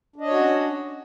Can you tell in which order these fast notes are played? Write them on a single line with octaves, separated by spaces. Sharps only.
D4 D#5 C#5 F#4 C#4